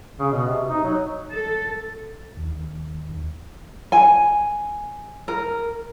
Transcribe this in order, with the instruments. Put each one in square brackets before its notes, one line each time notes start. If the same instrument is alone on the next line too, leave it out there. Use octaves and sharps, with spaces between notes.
[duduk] C#3
B2
C3
D#4
F#3
[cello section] A4
[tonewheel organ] D#2
[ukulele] G#5
A#4